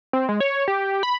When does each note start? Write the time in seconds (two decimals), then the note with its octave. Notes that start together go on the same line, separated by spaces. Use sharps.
0.13 C4
0.29 G#3
0.40 C#5
0.68 G4
1.03 B5